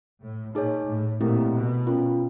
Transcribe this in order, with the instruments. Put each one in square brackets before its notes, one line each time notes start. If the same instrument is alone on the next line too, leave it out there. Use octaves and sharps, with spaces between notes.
[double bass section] A2
[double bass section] A#2 [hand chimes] D#4 G#4 C#5
[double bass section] A2
[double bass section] A#2 [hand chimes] A3 C4 E4 G4 A#4
[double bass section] B2
[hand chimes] C#4 F4 A#4